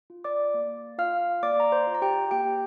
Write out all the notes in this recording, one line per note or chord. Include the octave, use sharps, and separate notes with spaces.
F4
D5 D6
A#3
F4 F5 F6
A#3 D5 D6
A#5
C5 C6
F4
A#5
G4 G5
A#3 G4 G5